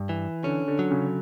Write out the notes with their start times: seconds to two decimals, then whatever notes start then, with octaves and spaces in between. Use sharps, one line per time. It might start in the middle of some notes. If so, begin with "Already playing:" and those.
Already playing: G2
0.09 E3
0.44 D3 C#4
0.68 D3
0.79 F#3
0.91 C#3